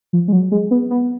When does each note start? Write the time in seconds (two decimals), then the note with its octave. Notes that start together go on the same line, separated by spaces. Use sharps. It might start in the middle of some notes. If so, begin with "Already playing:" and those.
0.13 F3
0.28 G#3
0.32 F#3
0.52 G#3
0.71 B3
0.90 B3